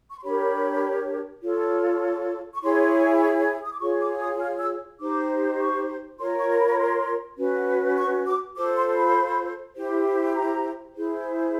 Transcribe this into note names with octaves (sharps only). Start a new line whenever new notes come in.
C#6
C6
D4 G4 A#4 C#5 B5
F4 A4 C#5
C#6
E4 G#4 C#5 C6
D#6
D6
F4 G#4 C#5 C#6
D6
D#6
F6
E6
D#4 G4 C5 D6
C#6
F4 A#4 C#5 C6
C#6
C6
B5
B5
C6
C#4 F#4 B4
C#6
D6
F4 A4 C5 D6
C6
B5
E4 G4 C5
A#5
E4 G#4 C5